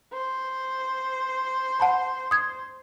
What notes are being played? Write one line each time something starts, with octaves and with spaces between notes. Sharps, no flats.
C5
F#5 A5 B5
D#6 G#6